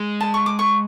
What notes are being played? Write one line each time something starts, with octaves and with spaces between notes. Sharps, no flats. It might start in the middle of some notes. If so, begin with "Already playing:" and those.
Already playing: G#3
A5
C#6
D6
C#6